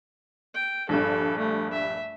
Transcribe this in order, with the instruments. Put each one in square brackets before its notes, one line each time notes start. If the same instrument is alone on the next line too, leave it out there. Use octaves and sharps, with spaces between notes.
[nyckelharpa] G5
[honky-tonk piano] A#1 G2 [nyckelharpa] A4
[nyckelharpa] A3
E5